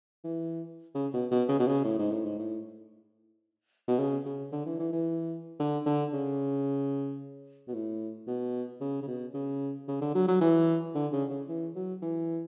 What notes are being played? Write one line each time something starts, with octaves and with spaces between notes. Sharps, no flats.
E3
C#3
B2
B2
C#3
B2
C#3
A2
G#2
A2
G#2
A2
B2
C#3
C#3
D3
E3
E3
E3
D3
D3
C#3
B2
A2
B2
C#3
C#3
B2
C#3
C#3
D3
F#3
F#3
E3
D3
C#3
C#3
E3
F#3
E3